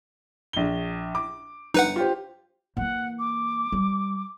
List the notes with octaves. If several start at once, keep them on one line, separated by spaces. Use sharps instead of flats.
A#1 G7
D6
G1 D#4 B4 F#5
F4 G4 C5
E3 A#3 F#5
D6
G3